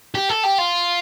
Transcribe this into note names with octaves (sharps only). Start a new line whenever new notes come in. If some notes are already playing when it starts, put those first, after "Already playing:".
G4
A4
G4
F4